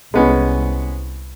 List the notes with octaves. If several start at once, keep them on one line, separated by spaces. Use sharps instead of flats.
C2 G#3 B3 C#4